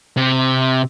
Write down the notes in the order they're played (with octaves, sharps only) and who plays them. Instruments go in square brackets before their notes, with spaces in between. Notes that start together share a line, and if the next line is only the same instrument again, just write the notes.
[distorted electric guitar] C3